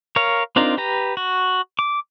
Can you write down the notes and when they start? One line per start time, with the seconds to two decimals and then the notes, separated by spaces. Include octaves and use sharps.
0.16 A#4 C#5 F5
0.56 C4 D4 D#4 F4 A#4
0.78 G4 B4 A#5
1.17 F#4
1.79 D6